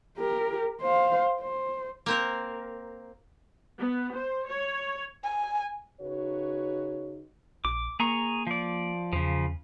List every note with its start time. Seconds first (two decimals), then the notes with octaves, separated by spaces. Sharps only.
0.18 G4 A#4
0.82 C5 F5
1.41 C5
2.06 A#3 C4 A#4
3.78 B3
4.15 C5
4.49 C#5
5.23 G#5
6.01 C#3 D#4 F#4 B4 C#5
7.65 A#1 D6
8.00 A#3 G#4 A#5 C#6
8.47 F3 D5
9.13 E2 C#3 F3